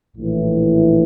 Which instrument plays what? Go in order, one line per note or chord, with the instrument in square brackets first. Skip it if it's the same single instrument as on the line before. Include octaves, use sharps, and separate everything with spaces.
[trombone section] A#1 A2 E3